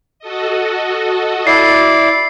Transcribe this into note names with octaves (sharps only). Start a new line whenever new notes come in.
F#4 A4 D#5
E4 D5 C7